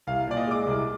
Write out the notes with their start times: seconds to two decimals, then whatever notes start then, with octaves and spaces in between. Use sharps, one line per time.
0.07 C2 F5
0.27 A#2 D5
0.37 D#5
0.47 G#3 D6
0.67 C2